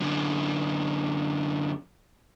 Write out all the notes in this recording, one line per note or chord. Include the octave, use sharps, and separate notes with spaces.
F#2 D3